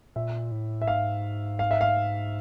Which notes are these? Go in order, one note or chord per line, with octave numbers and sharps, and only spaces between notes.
A#2 E5
A2
E5
G#2 F5
F5
E5
F5